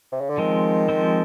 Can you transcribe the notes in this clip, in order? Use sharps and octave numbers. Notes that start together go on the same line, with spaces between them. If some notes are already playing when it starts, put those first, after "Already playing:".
C3
C#3
D3
D#3 F3 G#3 C4
F3 G#3 C4